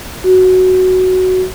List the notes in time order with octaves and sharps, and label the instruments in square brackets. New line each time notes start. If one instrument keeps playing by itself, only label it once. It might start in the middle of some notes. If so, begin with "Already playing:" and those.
[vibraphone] F#4